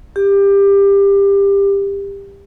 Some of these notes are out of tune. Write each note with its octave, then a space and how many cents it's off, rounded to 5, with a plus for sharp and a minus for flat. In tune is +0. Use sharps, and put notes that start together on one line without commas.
G4 +20